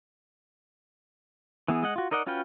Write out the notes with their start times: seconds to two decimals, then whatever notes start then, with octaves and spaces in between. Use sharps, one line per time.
1.68 E3 B3 G#4
1.83 G#3 D#5 F#5
1.96 F4 F#4
2.11 D#4 A#4 D5 D#5 F#5
2.27 C#4 F4 F#4 B4 G5